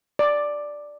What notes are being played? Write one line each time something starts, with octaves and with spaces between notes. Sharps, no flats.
D5